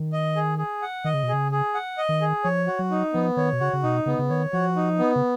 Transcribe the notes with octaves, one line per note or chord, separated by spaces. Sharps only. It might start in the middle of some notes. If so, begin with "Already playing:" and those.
Already playing: D#3
D#5
G#4
G#4
F#5
D#3 D#5
C#3
B2
C#3 G#4
G#4
F#5
D#5
D#3
G#4
F3 C#5
F#4
F#3
D#4
F3 B3
D#3 C#5
B2
C#3 F#4
C#3
B2 D#4
C#3 B3
C#3
D#3 C#5
F3 F#4
D#4
B3
C#3